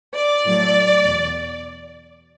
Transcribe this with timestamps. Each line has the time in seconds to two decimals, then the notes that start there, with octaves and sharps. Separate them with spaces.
0.16 D5
0.45 A2 F#3 A3
1.03 E2 B2